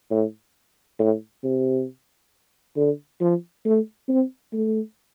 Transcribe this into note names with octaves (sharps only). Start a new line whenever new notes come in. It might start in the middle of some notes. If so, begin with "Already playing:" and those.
A2
A2
C3
D3
F3
A3
C4
A3